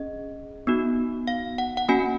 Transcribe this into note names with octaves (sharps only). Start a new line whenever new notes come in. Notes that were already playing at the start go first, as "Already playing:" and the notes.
Already playing: C#4 G#4 D#5
B3 D#4 F#4
F5
F#5
F#5
A#3 C#4 F#4 G#5